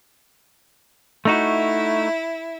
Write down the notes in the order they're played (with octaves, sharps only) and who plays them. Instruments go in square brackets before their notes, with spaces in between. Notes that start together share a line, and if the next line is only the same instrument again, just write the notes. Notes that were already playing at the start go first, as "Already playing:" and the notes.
[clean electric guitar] A3 D#4 F#4 [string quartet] E4